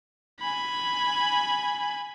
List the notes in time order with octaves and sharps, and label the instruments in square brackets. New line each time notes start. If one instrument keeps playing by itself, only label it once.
[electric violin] G#5 B5